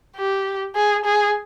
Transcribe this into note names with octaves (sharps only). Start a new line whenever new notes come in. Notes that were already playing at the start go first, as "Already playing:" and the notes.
G4
G#4
G#4